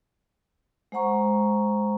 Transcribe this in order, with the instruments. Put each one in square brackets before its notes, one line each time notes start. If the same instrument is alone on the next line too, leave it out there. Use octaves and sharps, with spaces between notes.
[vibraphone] G#3 C5 F#5 A#5 C#6